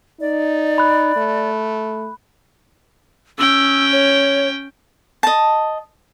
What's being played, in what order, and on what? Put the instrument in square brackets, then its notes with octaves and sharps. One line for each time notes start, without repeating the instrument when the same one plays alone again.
[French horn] D#4 [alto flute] D5
[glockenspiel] B5 F#6
[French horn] A3
[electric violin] C#4 G5 [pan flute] E6
[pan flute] C#5
[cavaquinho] D#5 A5